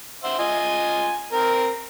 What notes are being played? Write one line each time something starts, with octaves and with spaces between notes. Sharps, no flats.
C5 E5 F#5
F4 D#5 G#5
C4 A#4 A#5